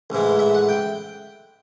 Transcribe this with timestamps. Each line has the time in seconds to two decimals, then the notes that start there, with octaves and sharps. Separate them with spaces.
0.10 A1 G#2 E3
0.39 E5
0.55 F#5
0.69 G5